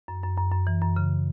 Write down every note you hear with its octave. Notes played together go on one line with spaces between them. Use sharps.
F#2
F#2
F#2
F#2
E3
F#2
C#3